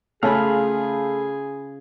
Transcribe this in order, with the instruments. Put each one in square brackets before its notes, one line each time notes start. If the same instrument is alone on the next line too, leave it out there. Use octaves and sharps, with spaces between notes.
[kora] C#3 F4 [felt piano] A3 [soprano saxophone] G#4 [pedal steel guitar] F5 B5